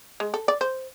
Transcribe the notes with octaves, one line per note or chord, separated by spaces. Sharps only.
G#3
A4
D5
C5